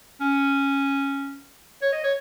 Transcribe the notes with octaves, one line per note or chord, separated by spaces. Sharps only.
C#4
C#5
D#5
C#5